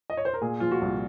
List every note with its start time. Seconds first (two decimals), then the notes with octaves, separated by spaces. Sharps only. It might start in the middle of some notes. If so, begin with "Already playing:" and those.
0.10 D#5
0.17 C#5
0.25 C5
0.34 A#4
0.42 A#2 G#4
0.60 F3 F4
0.71 F#4
0.81 C2